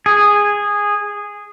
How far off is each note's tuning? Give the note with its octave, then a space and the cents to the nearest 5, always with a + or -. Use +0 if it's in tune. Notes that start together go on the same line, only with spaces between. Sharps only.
G#4 -10